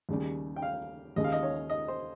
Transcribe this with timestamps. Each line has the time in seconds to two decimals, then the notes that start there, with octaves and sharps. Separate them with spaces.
0.09 D#2 C#3 G3
0.56 G5
0.62 F5
1.16 D#2 C#3 G#3 D#5
1.24 F5
1.32 D#5
1.43 C#5
1.70 D#5
1.88 C5